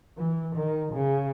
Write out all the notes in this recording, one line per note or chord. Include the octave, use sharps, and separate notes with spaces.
E3
D#3
C#3